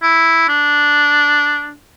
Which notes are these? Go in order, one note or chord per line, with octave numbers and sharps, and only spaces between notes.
E4
D4